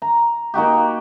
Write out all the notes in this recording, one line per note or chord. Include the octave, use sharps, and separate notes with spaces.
A#5
A#3 D#4 F#4 G4